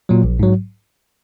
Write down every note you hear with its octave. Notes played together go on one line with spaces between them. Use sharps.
A#2 F#3
A#1
G#2 F#3